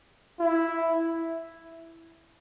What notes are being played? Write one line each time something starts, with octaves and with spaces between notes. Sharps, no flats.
E4